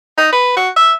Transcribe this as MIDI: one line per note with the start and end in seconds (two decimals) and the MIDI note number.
0.17 0.28 63
0.32 0.54 71
0.56 0.69 66
0.76 0.93 76